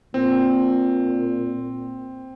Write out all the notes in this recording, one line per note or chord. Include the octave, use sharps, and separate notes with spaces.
A#2 C4